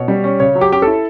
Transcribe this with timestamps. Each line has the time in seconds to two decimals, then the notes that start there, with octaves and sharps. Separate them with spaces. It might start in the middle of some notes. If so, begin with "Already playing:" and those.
Already playing: B2 C#5
0.08 G3
0.24 C#4
0.40 C#3 C#5
0.55 F#3
0.61 G4
0.72 C#4 G4
0.82 E4 A4